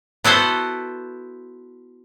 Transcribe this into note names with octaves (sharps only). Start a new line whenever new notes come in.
B3 E4 F#4 A4 C5